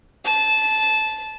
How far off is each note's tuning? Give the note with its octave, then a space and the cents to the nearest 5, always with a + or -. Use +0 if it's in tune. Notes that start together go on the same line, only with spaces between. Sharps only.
A5 -15